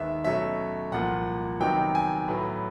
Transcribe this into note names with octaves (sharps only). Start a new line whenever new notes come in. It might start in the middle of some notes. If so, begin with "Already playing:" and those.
Already playing: D#2 D#3 G#3 B3 E5
B2 F#3 A3 C#4 E5
C2 A#2 F3 A#3 F#5
C3 D#3 F#3 B3 D#4 G5
G#5
A2 F#3 B3